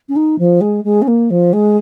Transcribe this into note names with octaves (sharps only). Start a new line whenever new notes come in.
C#4
D#4
F3
G#3
G#3
C#4
A#3
F3
G#3